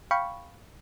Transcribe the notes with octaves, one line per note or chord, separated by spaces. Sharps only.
F5 G5 B5 C#6